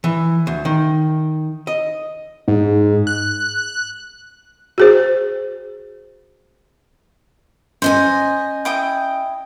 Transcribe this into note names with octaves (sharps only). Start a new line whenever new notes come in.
E3
D2
D#3
D#5
G#2
F#6
F#4 G#4 C5
C#4 C5 D#5 G#5
E4 G5 D#6